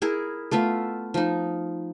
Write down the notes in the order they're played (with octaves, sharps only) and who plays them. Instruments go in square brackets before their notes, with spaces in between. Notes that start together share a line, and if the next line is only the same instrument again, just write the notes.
[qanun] E4 G#4 A#4
A3 B3 F4 E5
F3 D#4